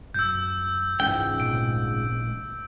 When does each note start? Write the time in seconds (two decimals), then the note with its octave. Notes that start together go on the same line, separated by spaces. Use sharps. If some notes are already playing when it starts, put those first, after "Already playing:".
0.14 F#2 E6 G6
1.00 C#2 G#2 E3 C#4 G5
1.40 A1 A#2 C4 D7